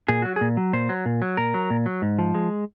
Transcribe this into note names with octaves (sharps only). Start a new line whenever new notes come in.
A#2 G#4
F#3 F#4
A#2 G#4
F#3
A#2 C5
F#3
A#2
F#3
A#2 A#4
F#3
A#2
F#3
G#2
F3
G#3